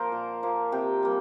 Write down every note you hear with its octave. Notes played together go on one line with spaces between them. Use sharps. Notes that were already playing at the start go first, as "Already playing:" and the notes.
Already playing: F3 A#3 A#4 C5
A#2
F3 A#3
C3 G5
G3 A#3